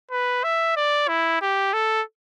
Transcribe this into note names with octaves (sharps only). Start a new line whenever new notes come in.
B4
E5
D5
E4
G4
A4